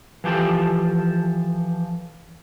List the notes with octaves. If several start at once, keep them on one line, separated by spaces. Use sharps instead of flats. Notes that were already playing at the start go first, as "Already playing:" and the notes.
E3 F3 G4 A4